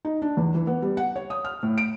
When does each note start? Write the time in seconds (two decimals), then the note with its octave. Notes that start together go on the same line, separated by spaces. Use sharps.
0.05 D#4
0.22 D4
0.37 E2
0.55 E3
0.67 B3
0.82 G3
0.97 F#5
1.16 C#5
1.30 D#6
1.45 F6
1.63 A2
1.78 D7